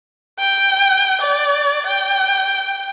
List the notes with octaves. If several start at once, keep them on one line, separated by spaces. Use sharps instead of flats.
G5
D5
G5